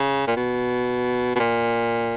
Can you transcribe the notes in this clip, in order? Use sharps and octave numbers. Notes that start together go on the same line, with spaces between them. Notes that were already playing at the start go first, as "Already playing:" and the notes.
Already playing: C#3
A#2
B2
B2
A#2